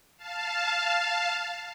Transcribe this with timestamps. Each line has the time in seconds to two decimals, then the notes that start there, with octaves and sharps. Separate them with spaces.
0.17 F5 A5